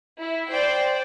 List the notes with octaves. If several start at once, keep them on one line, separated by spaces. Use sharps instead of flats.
E4
C5 D5 G5